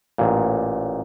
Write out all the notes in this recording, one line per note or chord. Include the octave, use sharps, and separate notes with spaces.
A1 A#2